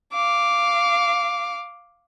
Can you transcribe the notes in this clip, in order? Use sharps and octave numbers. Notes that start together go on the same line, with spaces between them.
F5 D6